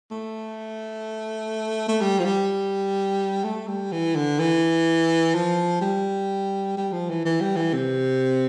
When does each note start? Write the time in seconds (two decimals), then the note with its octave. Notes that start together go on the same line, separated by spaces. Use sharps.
0.11 A3
1.88 A3
2.01 G3
2.19 F3
2.25 G3
3.44 A3
3.67 G3
3.92 E3
4.16 D3
4.40 E3
5.34 F3
5.81 G3
6.77 G3
6.93 F3
7.10 E3
7.25 E3
7.41 G3
7.56 E3
7.73 C3